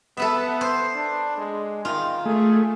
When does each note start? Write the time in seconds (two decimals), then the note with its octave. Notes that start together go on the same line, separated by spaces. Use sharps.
0.17 B3 A4 B4 E5
0.61 C5
0.95 D4
1.37 G#3
1.85 D#3 F4
2.26 A3 G#4